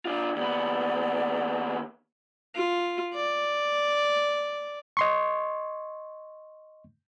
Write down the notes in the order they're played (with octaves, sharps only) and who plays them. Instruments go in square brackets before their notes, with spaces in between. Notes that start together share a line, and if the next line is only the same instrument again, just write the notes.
[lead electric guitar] D4 F4
[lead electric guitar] D#2 B3 [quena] D5
[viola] F4
D5
[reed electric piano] D#5 C6 C#6